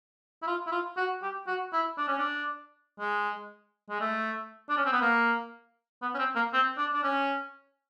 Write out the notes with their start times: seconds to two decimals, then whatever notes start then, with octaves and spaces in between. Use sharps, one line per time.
0.42 E4
0.47 F4
0.67 E4
0.72 F4
0.97 F#4
1.22 G4
1.47 F#4
1.73 E4
1.97 D4
2.08 C#4
2.19 D4
2.99 G#3
3.90 G#3
4.01 A3
4.69 D4
4.77 C#4
4.85 C4
4.93 B3
5.02 A#3
6.02 B3
6.15 C#4
6.19 C4
6.36 A#3
6.53 C4
6.77 D4
6.94 D4
7.04 C#4